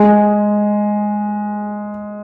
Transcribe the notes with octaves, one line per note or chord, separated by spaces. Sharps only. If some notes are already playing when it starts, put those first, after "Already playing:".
Already playing: G#3